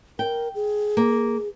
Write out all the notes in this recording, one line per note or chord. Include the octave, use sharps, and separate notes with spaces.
A#4 G5
G#4
A#3